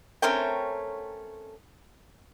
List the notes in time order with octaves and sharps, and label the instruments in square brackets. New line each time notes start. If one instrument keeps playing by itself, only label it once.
[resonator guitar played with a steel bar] A3 C4 C#4 A#4 C#5 G5